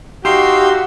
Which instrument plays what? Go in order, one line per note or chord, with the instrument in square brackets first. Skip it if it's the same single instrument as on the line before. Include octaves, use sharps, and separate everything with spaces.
[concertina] D#4 F5 E6 [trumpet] F#4 [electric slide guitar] G4 [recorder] C6